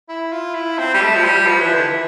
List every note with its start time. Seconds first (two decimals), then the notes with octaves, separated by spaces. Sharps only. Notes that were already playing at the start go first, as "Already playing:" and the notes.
0.09 E4
0.32 F4
0.55 E4
0.78 C4
0.94 G3
1.01 A3
1.16 F3
1.24 G3
1.47 F3
1.60 E3
1.74 D3
1.87 E3